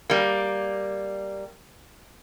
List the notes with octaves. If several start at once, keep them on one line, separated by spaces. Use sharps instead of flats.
G3 A#3